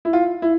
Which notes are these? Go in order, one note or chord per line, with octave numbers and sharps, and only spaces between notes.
E4
F4
E4